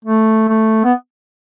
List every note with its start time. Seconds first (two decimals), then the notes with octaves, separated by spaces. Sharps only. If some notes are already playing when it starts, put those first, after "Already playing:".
0.05 A3
0.49 A3
0.85 B3